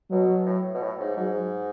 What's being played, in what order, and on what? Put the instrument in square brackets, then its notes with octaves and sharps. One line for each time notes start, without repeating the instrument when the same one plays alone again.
[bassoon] B2 [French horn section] F#3
[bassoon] A2
B2
A2
G#2
[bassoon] G#2 [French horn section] F#3